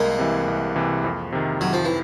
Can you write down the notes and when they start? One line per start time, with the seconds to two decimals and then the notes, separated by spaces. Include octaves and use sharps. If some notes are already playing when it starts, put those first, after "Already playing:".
Already playing: C2 G#3 A#3
0.19 C3 E3
0.48 C2
0.76 C3 E3
1.04 F2
1.32 C3 D#3
1.61 F2 F#3
1.73 F3
1.85 E3